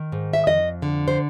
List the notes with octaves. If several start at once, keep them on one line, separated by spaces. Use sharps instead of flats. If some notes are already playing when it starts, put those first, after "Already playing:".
Already playing: D#3
G#2
E5
F2 D#5
D3
C5